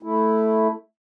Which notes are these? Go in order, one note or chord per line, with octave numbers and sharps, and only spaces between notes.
A3 E4